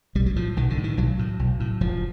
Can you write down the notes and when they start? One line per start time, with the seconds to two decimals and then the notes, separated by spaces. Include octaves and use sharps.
0.15 B1 G3
0.26 F#3
0.36 A2 F3
0.56 B1 D#3
0.70 D3
0.78 A2
0.84 D#3
0.97 B1 F#3
1.19 A2
1.39 B1
1.60 A2
1.81 F1 F3